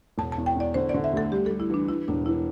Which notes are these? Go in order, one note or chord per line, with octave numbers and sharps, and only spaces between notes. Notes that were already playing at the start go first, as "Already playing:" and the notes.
E1 A5
A5
E2
G5
E2 D5
D3 C5
D5
D3
E5
D2 A4
G3 G4
A4
G3
E4
E3 D4
E3 E4
E1 D4
E3 E4